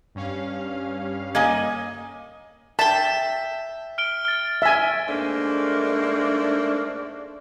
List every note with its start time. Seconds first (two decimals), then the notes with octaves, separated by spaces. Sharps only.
0.15 G2 C#4 F5
1.35 A#3 D#5 G#5
2.79 E5 G5 A5
3.98 F6 D7 G7
4.25 F6 A6
4.62 E5 G#5
5.08 G#2 A3 A#3 D4